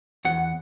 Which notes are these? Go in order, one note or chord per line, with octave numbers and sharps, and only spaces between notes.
E2 F#5